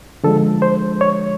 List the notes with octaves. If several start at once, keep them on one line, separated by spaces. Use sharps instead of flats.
D3 F3 G#3 A4
C5
C#5